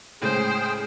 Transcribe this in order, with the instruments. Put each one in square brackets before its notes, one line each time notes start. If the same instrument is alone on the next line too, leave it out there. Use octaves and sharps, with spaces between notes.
[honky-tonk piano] A2 C#3 G#3 [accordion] G#4 G5 [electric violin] C5